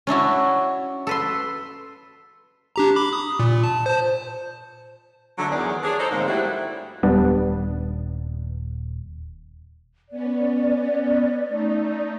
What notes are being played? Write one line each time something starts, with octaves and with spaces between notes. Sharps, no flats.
C#4 D4 E4 F#4
A4 B4 C6
D4 G4 A#5
B5 D6
D#6
A#2
A5
C5 A5
D3 F#3 A3 D4
E2 D#3 F#3 G#4 D5
D4 G#4 C#5
D#4 A4 C5
G#2 D3 F3 G#3 A#3 C4
G3 A3 C4 D4 E4 F#4
D#1 G3 B3 D4
B3 C#4 D5
A3 D#4